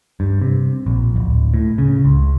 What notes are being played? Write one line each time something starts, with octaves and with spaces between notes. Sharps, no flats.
G2
C3
A#1
D1
A2
C#3
C#2